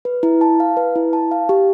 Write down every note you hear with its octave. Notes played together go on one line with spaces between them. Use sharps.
B4
E4
A5
F5
B4
E4
A5
F5
G4